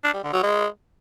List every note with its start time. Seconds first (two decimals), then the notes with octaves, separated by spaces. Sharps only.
0.04 D4
0.14 G3
0.23 D3
0.33 F#3
0.43 G#3